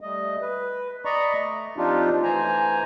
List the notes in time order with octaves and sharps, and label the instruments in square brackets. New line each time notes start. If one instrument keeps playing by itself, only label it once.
[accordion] G3 A3 D#5
B4
D5 D#5 A#5 B5 C#6
A3
F3 C4 D4 D#4 F4 G4
E3 A3 C5 G#5 A#5